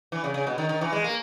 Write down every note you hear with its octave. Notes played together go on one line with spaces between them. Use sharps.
E3
C#3
C#3
B2
D#3
D#3
E3
G#3
A#3